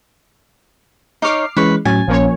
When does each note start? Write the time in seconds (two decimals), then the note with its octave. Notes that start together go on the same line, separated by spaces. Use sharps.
1.22 D#4 C#5 D6 F6 C7
1.57 E3 G#3 C#4 B4 C#6
1.85 A2 F#3 C#4 G#5 A6
2.07 A#1 F3 A#3 C#4 C#5